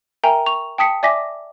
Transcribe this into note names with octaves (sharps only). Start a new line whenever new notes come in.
A#4 E5 G5 G#5 A#5
C#6 F7
G5 A5 D#6 B6 C#7
D5 E5 G#5 D6 A#6 B6